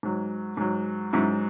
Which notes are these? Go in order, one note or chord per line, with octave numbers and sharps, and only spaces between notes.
G#2 F#3
G#2 F#3
G#2 F#3 C#4 E4